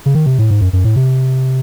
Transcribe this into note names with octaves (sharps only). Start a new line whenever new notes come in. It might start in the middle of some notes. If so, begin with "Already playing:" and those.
C#3
D#3
C3
A2
G#2
F#2
F#2
A2
C3